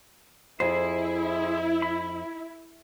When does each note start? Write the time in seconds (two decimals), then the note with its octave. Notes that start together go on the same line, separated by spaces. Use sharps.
0.60 F2 E4 G#4 C5
1.82 B5